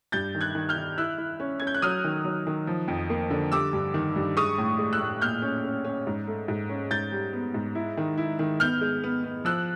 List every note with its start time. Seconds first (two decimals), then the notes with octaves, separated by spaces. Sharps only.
0.12 G2 G6 A6
0.35 D#3
0.41 F#6 G#6
0.55 D#3
0.69 F6 G6
0.76 D#3
0.98 E4 E6 F#6
1.18 E4
1.40 C#4
1.60 C#4 G#6
1.67 G6
1.74 F#6
1.82 F#3 D#6 F6
2.04 D#3
2.24 F#3
2.47 D#3
2.67 F3
2.88 F2
3.10 A#3
3.30 D3
3.52 G3 D6 E6
3.73 G2
3.94 D#3
4.16 G2
4.37 G#3 C#6 D#6
4.58 A2
4.79 G#3
4.93 E6 F#6
5.00 A2
5.22 A#2 F6 G6
5.42 C#4
5.65 C#4
5.85 C#4
6.07 G#2
6.28 A3
6.48 G#2
6.69 C#4
6.91 G#2 G6 A6
7.12 G3
7.33 B3
7.54 G#2
7.75 E4
7.97 D#3
8.18 E4
8.39 D#3
8.60 B3 F6 G6
8.81 G#3
9.04 B3
9.24 B3
9.45 F3 E6 F#6